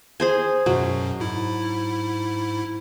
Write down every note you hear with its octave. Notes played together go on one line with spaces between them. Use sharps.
G#4 C5 G#5
F#2 B2 F#3
G#2 E4